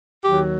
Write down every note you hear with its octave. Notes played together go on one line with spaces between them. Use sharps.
D#2 D#3 F#3 G4